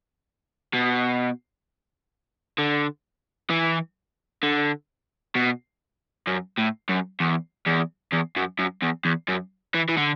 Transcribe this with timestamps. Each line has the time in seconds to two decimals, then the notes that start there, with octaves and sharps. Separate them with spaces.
0.73 B2
2.58 D3
3.50 E3
4.43 D3
5.36 B2
6.27 F#2
6.58 A2
6.89 F#2
7.20 E2
7.66 E2
8.12 E2
8.36 F#2
8.59 F#2
8.82 E2
9.05 E2
9.28 F#2
9.74 E3
9.89 E3
9.97 D3